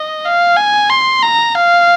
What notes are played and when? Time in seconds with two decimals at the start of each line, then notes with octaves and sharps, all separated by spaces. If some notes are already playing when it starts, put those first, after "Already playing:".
Already playing: D#5
0.25 F5
0.57 G#5
0.90 C6
1.23 A#5
1.55 F5